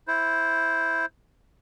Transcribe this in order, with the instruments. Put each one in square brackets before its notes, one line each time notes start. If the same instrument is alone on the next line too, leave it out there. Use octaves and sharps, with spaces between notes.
[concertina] E4 C5